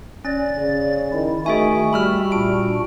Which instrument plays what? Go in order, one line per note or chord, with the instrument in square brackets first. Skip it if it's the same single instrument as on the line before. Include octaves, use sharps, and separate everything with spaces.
[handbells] C#4 [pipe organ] D5 A6
[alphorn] C#3
[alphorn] D#3 [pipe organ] E4
[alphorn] D#3 [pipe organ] A3 F#4 [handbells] G#4 E5 G#5
[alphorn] G3 [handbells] B5 E6 F6
[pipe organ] A#2 D4 F#4 [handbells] D7